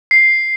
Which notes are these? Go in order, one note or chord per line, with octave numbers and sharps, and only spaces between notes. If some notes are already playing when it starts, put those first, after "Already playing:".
C7